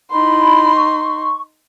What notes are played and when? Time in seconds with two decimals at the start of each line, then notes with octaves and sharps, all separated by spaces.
0.11 D#4 E4 B5 C6
0.76 C#6